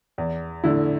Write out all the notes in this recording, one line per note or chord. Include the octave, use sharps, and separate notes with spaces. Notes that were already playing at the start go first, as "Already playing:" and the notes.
E2
D3 A3 E4